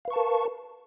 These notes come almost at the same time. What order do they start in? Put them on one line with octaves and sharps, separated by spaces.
F5 B4 C#6 A5 A#4